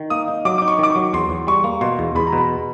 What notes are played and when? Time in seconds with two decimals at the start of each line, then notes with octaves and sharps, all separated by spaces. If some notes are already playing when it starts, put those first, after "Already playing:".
Already playing: D#3
0.10 A#3 D#6
0.28 D#4
0.45 F#3 D6
0.58 D#4 D6
0.68 C#6
0.79 D#3 D6
0.90 C#6
0.96 F#3
1.13 E2 C6
1.30 E2
1.47 G3 C#6
1.64 A#3
1.81 B2 C6
1.99 E2
2.15 E2 B5
2.27 A#5
2.33 B2
2.38 B5